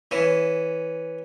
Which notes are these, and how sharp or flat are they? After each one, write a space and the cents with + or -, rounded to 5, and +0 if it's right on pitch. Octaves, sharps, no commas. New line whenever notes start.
E3 +0 C#4 +0